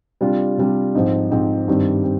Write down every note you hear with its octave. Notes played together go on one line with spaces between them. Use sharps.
C3 G3 D4 F4
C3 G3 D4 F4
G#2 F3 C4 D#4
G#2 F3 C4 D#4
G2 D#3 G3 C4
C4